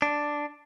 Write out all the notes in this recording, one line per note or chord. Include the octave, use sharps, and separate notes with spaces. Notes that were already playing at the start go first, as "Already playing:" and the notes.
D4